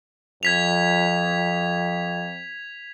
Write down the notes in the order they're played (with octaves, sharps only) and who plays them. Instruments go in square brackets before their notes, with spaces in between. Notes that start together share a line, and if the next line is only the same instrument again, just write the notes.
[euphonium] F2 [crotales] G#6 B6 F7